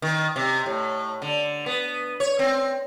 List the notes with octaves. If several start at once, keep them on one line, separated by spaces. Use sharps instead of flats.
D#3
C3
A2
D3
B3
C#5
C4